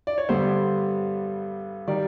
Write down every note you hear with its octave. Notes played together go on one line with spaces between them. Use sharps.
D5
C#5
G2 D3 G3 B3 C5
D#3 G3 D5